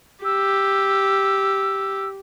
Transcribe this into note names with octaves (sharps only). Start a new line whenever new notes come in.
G4 E6